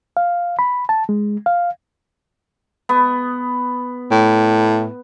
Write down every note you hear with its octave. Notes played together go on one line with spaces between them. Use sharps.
F5
B5
A5
G#3
F5
B3
A2